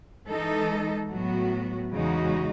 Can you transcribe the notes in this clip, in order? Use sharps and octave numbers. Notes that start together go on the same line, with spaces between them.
E3 G#3 D#4 A4
A2 F#3 B3 F#4
E2 C#3 G#3 D#4 F#4